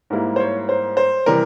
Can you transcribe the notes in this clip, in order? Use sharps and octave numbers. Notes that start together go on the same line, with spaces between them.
G#2 G3 A#3 E4
C5
C#5
C5
C5
C3 E3 G3 A#4